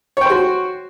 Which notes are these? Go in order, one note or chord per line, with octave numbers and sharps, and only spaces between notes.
F#4 C5 C#5 G5